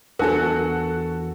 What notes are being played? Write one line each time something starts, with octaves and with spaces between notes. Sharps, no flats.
E2 D4 F#4 A4 A#4